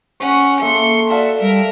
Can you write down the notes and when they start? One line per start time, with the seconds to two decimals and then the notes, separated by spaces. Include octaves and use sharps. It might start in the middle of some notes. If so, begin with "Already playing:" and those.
0.20 C#4 C#5 F#5 C#6
0.61 A#3 A4 E5 C6 C#7
1.11 F#4 D5 E5 F5 A5
1.41 G3 A#4 E5